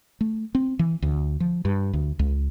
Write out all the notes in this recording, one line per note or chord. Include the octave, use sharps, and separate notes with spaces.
A3
C4
E3
D2
F3
G2
D2
C#2